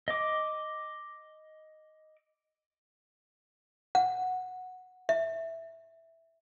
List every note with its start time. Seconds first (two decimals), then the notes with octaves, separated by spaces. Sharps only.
0.08 D#5 D6
3.95 F#5
5.09 E5